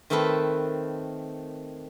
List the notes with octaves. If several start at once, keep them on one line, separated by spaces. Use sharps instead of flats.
D#3 A3 C4 A4 B4